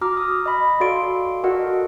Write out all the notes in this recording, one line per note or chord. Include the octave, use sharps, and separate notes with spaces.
F#4 A#5 D6 F6
D#6
D#5 B5
F#4 A4 D5 F5 C6 D7
F#4 A4 A#4 D#5 F#5